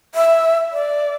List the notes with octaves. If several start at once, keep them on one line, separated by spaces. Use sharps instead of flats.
E5
D5